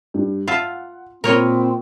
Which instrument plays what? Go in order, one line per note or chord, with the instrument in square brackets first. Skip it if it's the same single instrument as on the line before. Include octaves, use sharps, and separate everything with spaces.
[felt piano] G2
[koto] F4 E5 A5 [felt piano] F#5
[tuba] A#2 [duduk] C4 [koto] A#4 C#5 D#5 [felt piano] B5